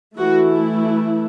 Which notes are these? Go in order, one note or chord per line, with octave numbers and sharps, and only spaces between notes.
E3 A3 E4 F#4